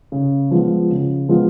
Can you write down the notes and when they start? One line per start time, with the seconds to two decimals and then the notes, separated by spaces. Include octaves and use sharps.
0.12 C#3
0.51 F3 G#3 B3 F4
0.90 C#3
1.29 F3 G#3 B3 F4